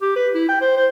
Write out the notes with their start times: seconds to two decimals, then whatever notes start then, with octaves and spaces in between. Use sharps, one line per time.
0.02 G4
0.16 B4
0.34 E4
0.49 G5
0.61 C5
0.77 C5